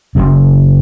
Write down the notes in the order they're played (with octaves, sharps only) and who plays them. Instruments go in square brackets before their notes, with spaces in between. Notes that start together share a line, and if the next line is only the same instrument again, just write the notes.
[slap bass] F#1 F#2 C#3